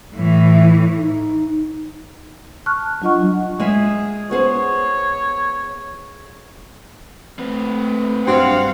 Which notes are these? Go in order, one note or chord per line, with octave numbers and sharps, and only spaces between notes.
A2 E3
D#4
A5 C#6 F6 F#6
F#3 D4 F4 D#5 F#5 C#6
G#3 F4 G#4 E5
B3 G#4 C5 C#5
A3 C4 B4
G2 F#3 C4 F5 F#5